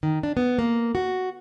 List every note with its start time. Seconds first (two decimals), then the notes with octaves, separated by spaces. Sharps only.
0.03 D#3
0.23 D4
0.37 B3
0.59 A#3
0.95 F#4